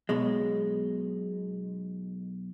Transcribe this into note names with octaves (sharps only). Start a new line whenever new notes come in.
B1 B2 G#3